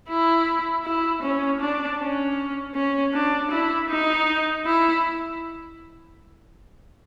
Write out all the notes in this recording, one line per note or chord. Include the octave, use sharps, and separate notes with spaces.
E4
E4
C#4
D4
C#4
C#4
D4
E4
D#4
E4